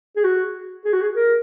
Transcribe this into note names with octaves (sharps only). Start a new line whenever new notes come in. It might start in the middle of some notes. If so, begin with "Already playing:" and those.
G#4
F#4
G#4
F#4
G#4
A#4